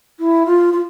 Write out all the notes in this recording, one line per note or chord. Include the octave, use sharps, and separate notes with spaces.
E4
F4
F4